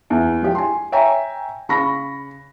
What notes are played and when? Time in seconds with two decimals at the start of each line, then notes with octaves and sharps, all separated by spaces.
0.10 E2
0.43 F3 G4
0.55 G#5 C6
0.92 C#5 E5 G5 G#5 A#5
1.69 C#3 B5 C#6 A#6